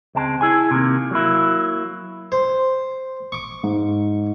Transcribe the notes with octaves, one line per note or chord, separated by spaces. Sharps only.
C#2 G#3 C4 A5
E4 G#4 G#5
C3 D#3 A#3
F#3 A#3 E4
C5
C#6 D6
G#2